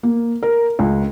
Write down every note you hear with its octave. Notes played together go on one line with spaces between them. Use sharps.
A#3
A#4
C#2